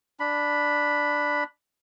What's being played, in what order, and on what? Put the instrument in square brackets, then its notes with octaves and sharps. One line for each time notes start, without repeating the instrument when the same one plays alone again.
[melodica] D4 B5